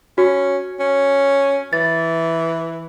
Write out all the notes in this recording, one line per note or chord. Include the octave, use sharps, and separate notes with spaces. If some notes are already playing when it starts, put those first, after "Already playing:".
C#4 F#4
C#4
E3 A6